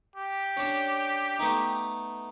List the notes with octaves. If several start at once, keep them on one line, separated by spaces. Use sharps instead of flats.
G4
C#4 D4
A3 B3 D#4